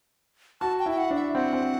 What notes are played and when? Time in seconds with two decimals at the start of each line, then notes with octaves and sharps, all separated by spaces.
0.61 F#4 A5
0.79 G5
0.86 E4
0.91 G5
0.98 F#5
1.11 D4
1.16 E5
1.35 C4 F#5
1.53 C4